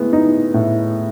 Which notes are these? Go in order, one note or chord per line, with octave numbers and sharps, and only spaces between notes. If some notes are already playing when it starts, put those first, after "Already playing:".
Already playing: A2 G#3 B3
D#4
A2